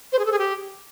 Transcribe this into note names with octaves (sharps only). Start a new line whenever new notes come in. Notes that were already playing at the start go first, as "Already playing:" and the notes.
C5
G#4
A4
G#4
G4